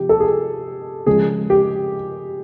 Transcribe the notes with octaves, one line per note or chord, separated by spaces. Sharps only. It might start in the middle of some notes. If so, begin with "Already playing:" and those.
Already playing: C3 F3 G4
A4
G#4
C#3 F3 G#3 G#4
G4